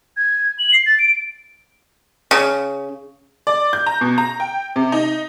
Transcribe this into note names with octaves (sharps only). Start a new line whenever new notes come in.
G#6
F#7
C7
A6
D7
C#3
D5
G6
A#5
B2
A#5
G5
C3
D#4